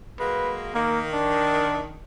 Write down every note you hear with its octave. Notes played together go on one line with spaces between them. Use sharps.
F#3 G#3 A#3 B4
D#3 A#3
D4